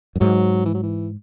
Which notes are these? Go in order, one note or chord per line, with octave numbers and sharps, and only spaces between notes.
F#2
G#2 F#3
E3
F#3
E3